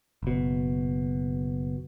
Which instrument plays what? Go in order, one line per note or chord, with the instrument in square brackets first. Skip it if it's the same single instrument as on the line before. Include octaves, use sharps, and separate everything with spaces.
[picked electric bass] F#1 B2